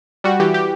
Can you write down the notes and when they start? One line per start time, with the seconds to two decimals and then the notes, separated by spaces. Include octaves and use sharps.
0.24 G3 F#4
0.40 E3 G4
0.54 G4